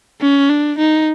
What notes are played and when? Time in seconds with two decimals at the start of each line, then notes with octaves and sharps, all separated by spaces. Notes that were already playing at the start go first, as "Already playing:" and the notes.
0.21 C#4
0.50 D4
0.78 D#4